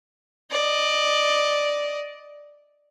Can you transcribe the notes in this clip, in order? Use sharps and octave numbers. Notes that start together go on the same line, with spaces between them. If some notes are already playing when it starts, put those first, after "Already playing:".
D5 D#5